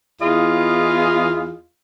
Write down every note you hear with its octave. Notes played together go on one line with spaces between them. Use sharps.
E2 E4 F4 G#4 D#5 F5